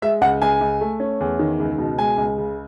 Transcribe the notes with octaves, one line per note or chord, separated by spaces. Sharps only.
G#3 E5
C#2 F#5
C#2 G#5
C#2
A3
C#4
E2
D#3
C#2
B2
G#3 G#5
C#2
C#3